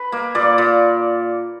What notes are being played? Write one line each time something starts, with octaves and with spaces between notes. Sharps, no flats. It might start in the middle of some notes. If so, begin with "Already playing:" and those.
Already playing: B4
A#3
A#2 D5
A#2